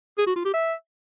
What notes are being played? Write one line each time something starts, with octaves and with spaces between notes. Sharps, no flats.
G#4
F#4
F4
G4
E5